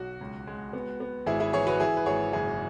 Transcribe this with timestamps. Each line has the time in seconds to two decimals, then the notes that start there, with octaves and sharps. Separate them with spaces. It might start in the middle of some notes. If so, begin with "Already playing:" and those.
Already playing: B1 F#4
0.21 C#2
0.47 G#3
0.73 B3
1.00 B3
1.26 G#1 E4 G#4
1.40 E4 G#4
1.53 E3 G#4 C#5
1.67 F#4 B4
1.80 E3 E4 G#4
1.97 B4
2.06 G#1 G#4 C#5
2.33 F#1 E4 G#4